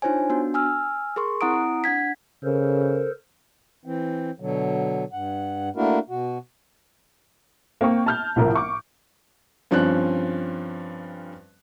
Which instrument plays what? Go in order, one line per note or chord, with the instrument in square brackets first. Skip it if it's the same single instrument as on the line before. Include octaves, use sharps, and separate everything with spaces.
[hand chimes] D4 D#4 F4 C5 C#5 G#5
B3 D4 F#4
G#5 E6 F6
G#4 A#4 C6 C#6
C4 E4 F#5 A#5 D#6 D7
D4 F#5 G#6 B6
[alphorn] C#3 [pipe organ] A4 A#4 C5
[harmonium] E3 C4
B2 D3 F#3
G2 F#5
A3 A#3 D4 E4 F#4 A#4
B2 F#4
[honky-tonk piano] A#3 C4 G5 C#6
A5 F6 G6
C2 A2 F3 A#4
C#6 D6
[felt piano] G2 F3 C4 C#4 F#6